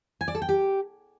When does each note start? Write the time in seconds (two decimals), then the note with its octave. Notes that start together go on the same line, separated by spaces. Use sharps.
0.21 G#5
0.28 D5
0.35 A4
0.42 G5
0.49 G4